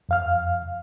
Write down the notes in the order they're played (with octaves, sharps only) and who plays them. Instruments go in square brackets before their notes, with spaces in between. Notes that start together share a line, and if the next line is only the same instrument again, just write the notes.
[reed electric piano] F2 F5 F6